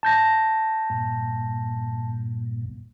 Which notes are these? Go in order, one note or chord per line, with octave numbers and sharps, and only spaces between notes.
A5 G6 A#6
G2 A#2